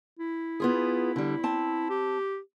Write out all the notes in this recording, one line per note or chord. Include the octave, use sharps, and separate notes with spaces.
E4
B3 F4 G#4
D3 G3
C4 A5
G4